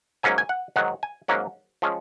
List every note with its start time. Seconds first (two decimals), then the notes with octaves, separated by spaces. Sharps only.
0.23 G#2 F#3 A#3 C#4 G#5
0.38 G#5
0.49 F#5
0.76 G#2 D#3 F#3 F#5
1.03 G#5
1.28 G#2 F#3 A#3 C#4 F#5
1.82 F3 G#3 C#4